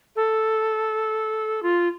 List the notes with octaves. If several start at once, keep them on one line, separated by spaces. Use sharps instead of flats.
A4
F4